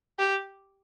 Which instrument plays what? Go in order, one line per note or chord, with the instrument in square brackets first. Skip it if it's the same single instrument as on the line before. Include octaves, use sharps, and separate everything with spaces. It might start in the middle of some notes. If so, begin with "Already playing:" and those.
[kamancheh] G4